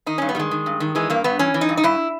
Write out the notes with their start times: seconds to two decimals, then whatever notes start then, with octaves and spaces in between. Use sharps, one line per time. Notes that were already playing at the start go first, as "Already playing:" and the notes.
0.06 D#3 D#4
0.18 G2 C#4
0.29 B3
0.35 D#3 G3 G#3
0.51 D#3
0.66 G2
0.80 D#3
0.95 E3 G#3
1.10 G2 A#3
1.24 G2 B3
1.39 E3 C#4
1.54 E3
1.61 D#4
1.69 G2
1.77 D#4
1.84 G2 E4